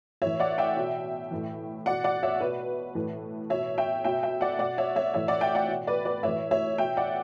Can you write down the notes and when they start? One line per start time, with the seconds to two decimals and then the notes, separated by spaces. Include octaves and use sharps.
0.22 A2 E3 C#5 E5
0.40 D5 F#5
0.58 E5 G5
0.77 B2
1.31 A2 E3
1.86 B2 D5 F#5
2.04 D5 F#5
2.23 C#5 E5
2.40 B2 B4
2.95 A2 E3
3.50 B2 C#5 E5
3.78 E5 G5
4.04 B2 E5 G5
4.23 E5 G5
4.41 D5 F#5
4.59 B2 D5 F#5
4.78 C#5 E5
4.96 C#5 E5
5.14 A2 E3 C#5 E5
5.28 D5 F#5
5.41 E5 G5
5.55 D5 F#5
5.68 B2
5.87 B4 D5
6.05 B4 D5
6.23 A2 E3 C#5 E5
6.51 C#5 E5
6.78 B2 E5 G5
6.97 D5 F#5